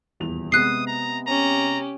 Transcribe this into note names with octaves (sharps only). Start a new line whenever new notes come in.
D#1 E2 F7
C3 G#3 B3 D#6 F#6 C7
A#5
C#4 G4 A#5